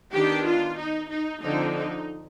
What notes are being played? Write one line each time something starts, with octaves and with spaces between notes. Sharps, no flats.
D#3 B3 D4 G4
F4
D#4
D#4
D3 F3 C4 D#4
D#4